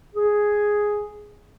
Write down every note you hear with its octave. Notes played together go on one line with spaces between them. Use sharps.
G#4